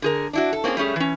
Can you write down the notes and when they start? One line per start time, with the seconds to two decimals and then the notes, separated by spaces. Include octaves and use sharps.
0.02 D3 G#4 A#4
0.33 D4 E4 F#4
0.53 A4
0.64 A#3 C4 C#4 F4 G#4
0.77 G3 A3 C#4 G#4
0.96 E3 C#4